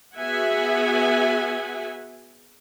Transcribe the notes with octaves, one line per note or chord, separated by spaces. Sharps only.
B3 F#4 G#4 E5 F#5 G#5